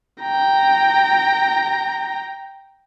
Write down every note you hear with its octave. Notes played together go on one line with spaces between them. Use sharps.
G5 A#5